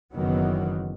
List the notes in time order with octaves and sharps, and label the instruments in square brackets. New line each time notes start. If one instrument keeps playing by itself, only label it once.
[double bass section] F#1 D#3 E3 F#3 B3